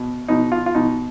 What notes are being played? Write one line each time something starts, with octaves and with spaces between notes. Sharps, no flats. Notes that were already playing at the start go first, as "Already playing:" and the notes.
Already playing: B2
B2 D#4
F4
F4
B2 D#4